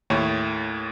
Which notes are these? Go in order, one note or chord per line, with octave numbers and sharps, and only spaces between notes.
D#2 A2 C#5